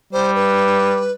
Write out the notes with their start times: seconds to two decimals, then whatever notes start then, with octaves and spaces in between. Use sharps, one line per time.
0.13 G3 C5
0.35 B4